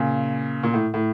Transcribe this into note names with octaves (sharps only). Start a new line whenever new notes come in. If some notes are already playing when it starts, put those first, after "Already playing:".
Already playing: A#2 C#3
A#2
A2
A2